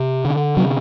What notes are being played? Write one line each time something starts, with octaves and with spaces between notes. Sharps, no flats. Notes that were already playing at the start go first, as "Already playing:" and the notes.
Already playing: C3
D3
C3 F#3